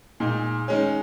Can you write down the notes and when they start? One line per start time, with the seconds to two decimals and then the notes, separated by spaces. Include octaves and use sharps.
0.20 A#2 G#3 D#4
0.68 D#3 G#3 C#4